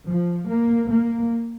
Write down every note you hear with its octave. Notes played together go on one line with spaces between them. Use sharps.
F3
A#3
A#3